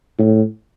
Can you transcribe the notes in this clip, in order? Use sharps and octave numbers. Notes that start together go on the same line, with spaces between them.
A2